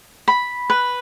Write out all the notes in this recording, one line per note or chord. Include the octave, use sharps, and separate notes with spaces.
B5
B4